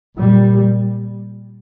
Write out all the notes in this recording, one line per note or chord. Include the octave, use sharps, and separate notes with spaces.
A#2 G3